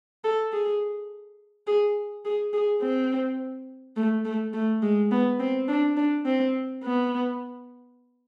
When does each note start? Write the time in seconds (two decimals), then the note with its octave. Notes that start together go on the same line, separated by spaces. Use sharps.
0.24 A4
0.52 G#4
1.67 G#4
2.25 G#4
2.53 G#4
2.82 C4
3.96 A3
4.25 A3
4.53 A3
4.82 G#3
5.11 B3
5.39 C4
5.68 D4
5.97 D4
6.25 C4
6.84 B3